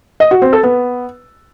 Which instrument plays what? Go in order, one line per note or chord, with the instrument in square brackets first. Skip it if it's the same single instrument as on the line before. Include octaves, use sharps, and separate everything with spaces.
[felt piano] D#5
F#4
C4
A4
B3